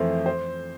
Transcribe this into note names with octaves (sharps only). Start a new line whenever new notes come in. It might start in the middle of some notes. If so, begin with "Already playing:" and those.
Already playing: F2 E3 A3 C5
C5